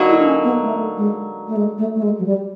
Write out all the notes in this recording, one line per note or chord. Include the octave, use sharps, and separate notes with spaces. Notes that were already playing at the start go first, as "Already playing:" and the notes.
Already playing: D3 F#3 A#3 D#4 F#4
E4
D4
C#4
B3
A3
G#3
A3
G#3
A3
A3
G#3
F#3
G3